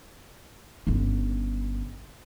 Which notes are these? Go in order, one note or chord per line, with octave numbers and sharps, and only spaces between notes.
G1 C#3